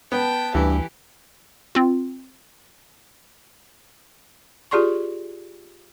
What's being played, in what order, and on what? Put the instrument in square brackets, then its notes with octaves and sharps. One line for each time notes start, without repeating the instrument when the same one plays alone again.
[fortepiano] B3 [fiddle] G5 A5
[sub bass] D2 [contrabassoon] G2 [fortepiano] E3 [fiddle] G4
[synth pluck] C4 F4
[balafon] F4 G4 G#4 D5 C6 C#6